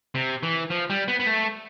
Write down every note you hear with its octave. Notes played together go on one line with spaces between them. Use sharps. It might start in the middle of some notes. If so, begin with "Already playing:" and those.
C3
E3
F3
G3
B3
B3
A3